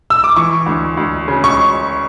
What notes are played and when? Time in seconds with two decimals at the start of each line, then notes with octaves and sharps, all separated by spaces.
0.10 E6
0.24 D6
0.36 E3 C#6
0.66 D2
0.97 D2
1.28 C#3
1.44 C#6